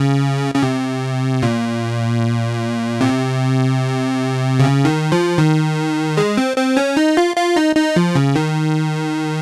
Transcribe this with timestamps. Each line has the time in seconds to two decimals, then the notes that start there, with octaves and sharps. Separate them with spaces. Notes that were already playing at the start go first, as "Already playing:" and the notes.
Already playing: C#3
0.55 C#3
0.63 C3
1.43 A#2
3.01 C3
4.59 C#3
4.85 D#3
5.12 F3
5.38 D#3
6.17 G#3
6.37 C4
6.57 C4
6.77 C#4
6.97 D#4
7.17 F4
7.36 F4
7.56 D#4
7.76 D#4
7.96 F3
8.15 C#3
8.36 D#3